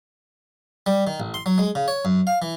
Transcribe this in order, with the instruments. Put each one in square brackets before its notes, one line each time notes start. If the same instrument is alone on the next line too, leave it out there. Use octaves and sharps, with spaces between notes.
[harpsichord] G3
D#3
A1
C6
F#3
G#3
C#3
C#5
F#2
F5
E3